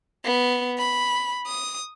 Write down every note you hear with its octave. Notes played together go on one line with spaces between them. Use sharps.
B3
B5
D#6